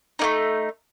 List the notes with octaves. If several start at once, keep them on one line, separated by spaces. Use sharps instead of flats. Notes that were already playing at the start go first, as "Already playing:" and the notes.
A3 A#3 D#4